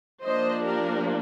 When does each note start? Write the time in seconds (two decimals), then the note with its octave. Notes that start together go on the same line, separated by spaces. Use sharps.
0.23 F3 A#3 D4 C5 D#5
0.63 G4 A#4